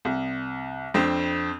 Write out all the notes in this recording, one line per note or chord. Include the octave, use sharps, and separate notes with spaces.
C2
F2 C4 D4